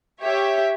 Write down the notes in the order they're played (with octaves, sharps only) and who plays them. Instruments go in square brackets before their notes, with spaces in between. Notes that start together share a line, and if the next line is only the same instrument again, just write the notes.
[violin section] G4 C#5 E5